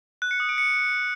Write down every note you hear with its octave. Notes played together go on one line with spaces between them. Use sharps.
F#6
C#7
D#6
D7
C#7